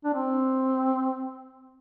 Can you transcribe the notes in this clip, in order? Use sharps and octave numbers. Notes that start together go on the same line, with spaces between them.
D4
C4